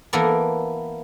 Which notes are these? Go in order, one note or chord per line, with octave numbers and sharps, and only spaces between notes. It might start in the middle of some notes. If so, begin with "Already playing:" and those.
E3 A#3 B3 A4 A#4 D5